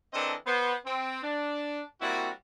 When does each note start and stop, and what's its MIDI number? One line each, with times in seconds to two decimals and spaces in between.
0.13 0.33 52
0.13 0.33 60
0.13 0.33 62
0.13 0.33 69
0.13 0.33 70
0.13 0.33 75
0.46 0.73 59
0.46 0.73 72
0.85 1.19 60
1.23 1.81 62
2.01 2.29 55
2.01 2.29 58
2.01 2.29 60
2.01 2.29 64
2.01 2.29 66